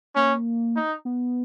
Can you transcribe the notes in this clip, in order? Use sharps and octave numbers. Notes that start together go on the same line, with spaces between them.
A#3 C#4
D#4
B3